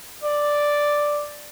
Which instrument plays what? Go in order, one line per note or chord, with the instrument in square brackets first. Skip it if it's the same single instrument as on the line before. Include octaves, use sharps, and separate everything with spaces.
[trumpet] D5